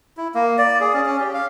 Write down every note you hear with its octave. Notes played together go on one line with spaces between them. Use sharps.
E4
A#3
D5
G#4
C#4
C#4
G4
F5